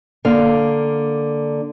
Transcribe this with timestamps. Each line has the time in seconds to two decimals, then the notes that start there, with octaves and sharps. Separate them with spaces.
0.25 D3 A#3 F5